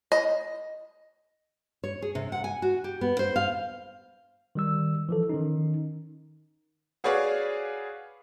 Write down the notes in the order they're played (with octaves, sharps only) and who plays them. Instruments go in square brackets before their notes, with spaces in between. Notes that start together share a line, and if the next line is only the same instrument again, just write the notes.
[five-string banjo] D#5
[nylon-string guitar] C#5
G#4
C3
F#5
G#5
F#4
G4
B3
C5
F5
[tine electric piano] D#3 G3 E6
E3 F3 A4
D#3 C#4 D#4
[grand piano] F#4 G#4 B4 C#5 D5 F5